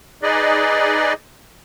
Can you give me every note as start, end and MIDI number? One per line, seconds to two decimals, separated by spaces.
0.23 1.13 63
0.23 1.13 68
0.23 1.13 71
0.23 1.13 74
0.23 1.13 75